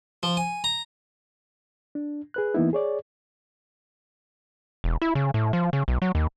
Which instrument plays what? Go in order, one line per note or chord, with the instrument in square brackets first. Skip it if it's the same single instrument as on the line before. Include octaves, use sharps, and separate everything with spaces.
[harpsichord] F3
G#5
A#5
[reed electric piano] D4
G#4 B4 F#6
E3 A#3 B3 D#4 E4
G#4 C#5 D5
[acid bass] E1
E4
C#3
A2
F3
C#3
B1
F#3
D#2